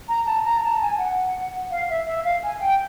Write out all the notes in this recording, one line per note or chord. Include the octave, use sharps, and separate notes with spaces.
A#5
A5
A#5
A5
G#5
F#5
F5
E5
E5
F5
G#5
G5